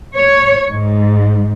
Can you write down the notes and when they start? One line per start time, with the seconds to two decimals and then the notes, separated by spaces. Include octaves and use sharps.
0.16 C#5
0.69 G#2